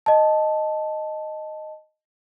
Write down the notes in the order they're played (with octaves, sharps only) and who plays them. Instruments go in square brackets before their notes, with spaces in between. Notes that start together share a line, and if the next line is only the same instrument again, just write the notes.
[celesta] D#5 A5